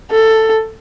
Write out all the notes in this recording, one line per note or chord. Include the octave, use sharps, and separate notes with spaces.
A4